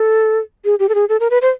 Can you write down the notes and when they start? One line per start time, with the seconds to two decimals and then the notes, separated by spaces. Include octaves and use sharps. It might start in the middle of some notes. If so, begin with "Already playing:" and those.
Already playing: A4
0.65 G#4
0.79 G4
0.89 A4
0.95 G#4
1.09 A4
1.20 A#4
1.30 B4
1.42 C5